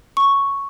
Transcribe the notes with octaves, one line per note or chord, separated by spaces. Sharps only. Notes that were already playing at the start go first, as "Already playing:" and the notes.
C#6